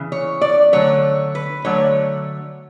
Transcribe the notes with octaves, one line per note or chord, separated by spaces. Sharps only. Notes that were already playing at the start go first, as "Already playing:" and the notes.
Already playing: C#3 E3
C#5
D5
D3 F#3 A3 C#5
B4
D3 F#3 A3 C#5